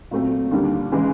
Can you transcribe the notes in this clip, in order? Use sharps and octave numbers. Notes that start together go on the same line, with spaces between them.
A#2 F#3 A3 C4
D#2 D3 G3 A#3 D4
C#3 E3 G#3